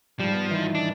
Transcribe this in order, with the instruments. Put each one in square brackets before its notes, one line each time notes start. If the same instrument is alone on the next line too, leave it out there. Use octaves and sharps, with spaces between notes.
[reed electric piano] G#2 G3 [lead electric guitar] F3
[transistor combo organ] B3
D#3 E3
[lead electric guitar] D4